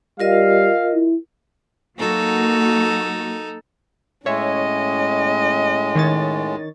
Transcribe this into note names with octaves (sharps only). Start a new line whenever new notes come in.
G3 F4 A#4 D#5 F5
E4
F#3 A#3 D#4 F#4 A4
A2 G#3 C#4 C#5 D#5 E5
D#3 C#5 A6